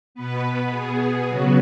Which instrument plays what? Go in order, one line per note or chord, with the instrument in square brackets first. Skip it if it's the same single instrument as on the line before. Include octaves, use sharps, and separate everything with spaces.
[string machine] B2 B3 B4
B2 B3 G#4
C#3 F#3 B3 F#4